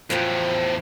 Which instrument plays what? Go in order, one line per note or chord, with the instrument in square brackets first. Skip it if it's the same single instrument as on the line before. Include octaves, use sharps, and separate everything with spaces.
[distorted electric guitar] E2 A2 [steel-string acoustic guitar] F3 F#3 C4